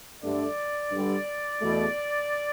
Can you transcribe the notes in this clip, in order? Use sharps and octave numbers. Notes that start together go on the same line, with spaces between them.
G2 D3 A3 D5
G2 D3 G3
E2 B2 A3